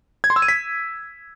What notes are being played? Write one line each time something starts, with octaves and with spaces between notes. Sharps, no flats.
G#6
C6
E6
D#7
B6